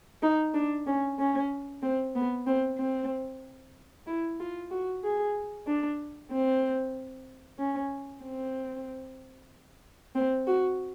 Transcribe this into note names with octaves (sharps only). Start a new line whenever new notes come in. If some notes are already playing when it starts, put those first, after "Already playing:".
D#4
D4
C#4
C#4
C4
B3
C4
C4
E4
F4
F#4
G#4
D4
C4
C#4
C4
C4
F#4